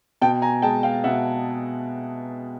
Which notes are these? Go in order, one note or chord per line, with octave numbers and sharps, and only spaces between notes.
B2 G5 A5
G#5 A#5
G#3 G5 A5
F5 G5
B2 E5 F#5